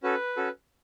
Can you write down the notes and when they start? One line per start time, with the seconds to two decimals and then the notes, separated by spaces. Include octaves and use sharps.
0.03 C#4 F#4 A4 B4
0.37 C#4 F#4 A4